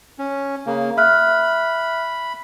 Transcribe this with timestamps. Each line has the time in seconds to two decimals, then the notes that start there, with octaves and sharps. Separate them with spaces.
0.19 C#4
0.66 C#3 A#3
0.97 E5 B5 F6 F#6